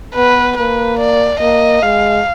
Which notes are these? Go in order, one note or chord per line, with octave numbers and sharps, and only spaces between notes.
B3 B4
A#3 B4
D5
A#3 D#5
G#3 F5